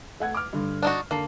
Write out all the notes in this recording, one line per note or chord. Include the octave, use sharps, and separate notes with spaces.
A3 F#5 G#6
D6 F6
G2 D3
D4 D#4 F#4
D3 A#3 A5 C7